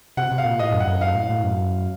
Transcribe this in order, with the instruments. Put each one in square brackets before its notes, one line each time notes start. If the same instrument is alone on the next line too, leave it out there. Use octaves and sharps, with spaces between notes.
[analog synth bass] C3 [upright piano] F#5
[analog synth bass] C3
[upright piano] F5
[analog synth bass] A#2
[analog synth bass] A2 [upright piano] D#5
[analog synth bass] F#2
[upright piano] F#5
[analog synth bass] F#2
[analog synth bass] F#2 [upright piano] F5
[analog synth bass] A2
A2
F#2